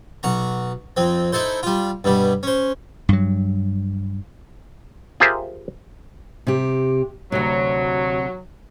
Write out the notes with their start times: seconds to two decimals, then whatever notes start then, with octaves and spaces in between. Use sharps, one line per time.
0.23 B1 F#4 A#5
0.97 F2 C4
1.32 D#4 E4 A4 C5
1.63 G3 F4
2.04 G2 B2 G3
2.43 C#4 C5
3.09 G2 F#3
5.20 F4 G4 G#4 A#4 C5 E5
6.47 C3 G4
7.32 D2 C3 F#3